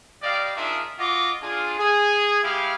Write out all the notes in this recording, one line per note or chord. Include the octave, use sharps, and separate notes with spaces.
G3 D5 D#5 F5
D4 D#4 F4 G#4 A#4 E5
F4 F#4 D#5 D6
D4 F4 G#4
G#4
G#3 E4 G4 G#4 F5